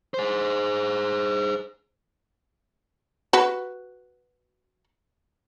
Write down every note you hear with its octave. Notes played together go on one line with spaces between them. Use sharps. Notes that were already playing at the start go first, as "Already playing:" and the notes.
G#4 C5
F#4 B4